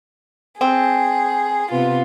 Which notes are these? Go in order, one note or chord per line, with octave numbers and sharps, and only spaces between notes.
C4 G#4
C3 B3 F4